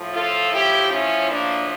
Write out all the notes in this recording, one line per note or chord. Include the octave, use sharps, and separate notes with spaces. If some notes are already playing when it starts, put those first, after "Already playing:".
Already playing: A2 F3
F4 A4
E4 G4
C#4 E4
A#3 D4